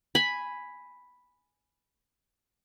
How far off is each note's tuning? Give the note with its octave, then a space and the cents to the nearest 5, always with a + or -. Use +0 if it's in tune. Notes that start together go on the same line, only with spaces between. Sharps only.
G#5 +0 B5 +0